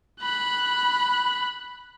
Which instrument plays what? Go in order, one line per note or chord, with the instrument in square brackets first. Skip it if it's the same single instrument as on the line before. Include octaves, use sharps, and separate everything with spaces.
[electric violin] B5 F#6